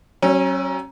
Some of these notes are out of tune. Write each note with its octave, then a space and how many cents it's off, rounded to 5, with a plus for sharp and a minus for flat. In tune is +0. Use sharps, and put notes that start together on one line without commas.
F#3 +30 C#4 -25